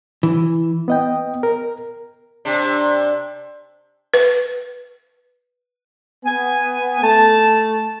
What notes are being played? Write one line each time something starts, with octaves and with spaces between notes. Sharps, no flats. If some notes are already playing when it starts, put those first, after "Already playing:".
E3
B3 D#5 G5
A#4
C3 D4
B4
B3 G#5
A3 A5